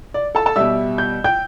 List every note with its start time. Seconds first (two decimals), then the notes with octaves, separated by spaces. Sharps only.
0.14 D5
0.35 A4 A5
0.46 A4 A5
0.56 B2 G3 E5 E6
0.98 G6
1.24 G5 G6